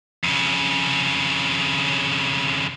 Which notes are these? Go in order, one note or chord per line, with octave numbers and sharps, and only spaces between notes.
F2 C#3